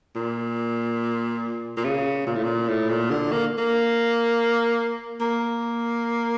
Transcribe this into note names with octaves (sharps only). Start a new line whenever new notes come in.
A#2
A#2
C#3
A#2
A2
A#2
A2
A#2
D3
A#3
A#3
A#3